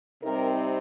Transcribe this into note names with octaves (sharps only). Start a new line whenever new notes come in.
C3 G3 C4 D#4 A#4